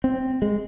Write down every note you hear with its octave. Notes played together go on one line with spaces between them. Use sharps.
C4
G#3